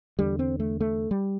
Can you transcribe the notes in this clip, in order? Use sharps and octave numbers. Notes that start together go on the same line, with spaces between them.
E2 D3 G3
C4
A3
A3
G3